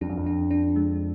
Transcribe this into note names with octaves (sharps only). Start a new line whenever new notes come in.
F2 D4
F#2
F2
D4
D4
G#3